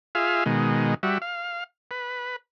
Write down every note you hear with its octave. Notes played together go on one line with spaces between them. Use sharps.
F4 G#4 E5 F5
B2 D#3 G#3
G3 F#4 E5
F5
B4